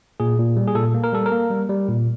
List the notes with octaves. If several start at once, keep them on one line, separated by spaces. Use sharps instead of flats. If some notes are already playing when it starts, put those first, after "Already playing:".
A#2 G#4
A#2
G3
G#4
A#2 A4
A#3
A#4
G3 A4
A#4
A#3
G3
G3
A#2